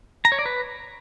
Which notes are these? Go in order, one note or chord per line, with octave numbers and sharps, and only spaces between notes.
A#5
C#5
D5
B4